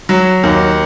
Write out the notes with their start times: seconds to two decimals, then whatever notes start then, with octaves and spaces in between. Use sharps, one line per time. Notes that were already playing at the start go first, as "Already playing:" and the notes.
0.09 F#3
0.43 D#2